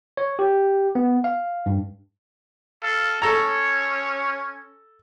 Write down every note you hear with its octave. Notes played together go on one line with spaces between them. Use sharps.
C#5
G4
B3
F5
G2
A4 F5
C#4 A4 C#5 A#5